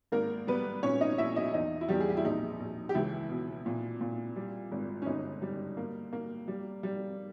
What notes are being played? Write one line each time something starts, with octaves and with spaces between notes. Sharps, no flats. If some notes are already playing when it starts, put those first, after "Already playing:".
G#1 A#3 A#4
G3 B3 B4
A#2 C#4 C#5
D#4 D#5
A#1 E4 E5
D#4 D#5
E2 D#4 D#5
E4
E2 G3 G4
G#4
G4
E4
A#1 D#4
A#1
G4
C#2 E3 E4
B2
A#2
A#2
G3
G#1
C#4
G1 D#4
G3
A#3
A#3
G3
G3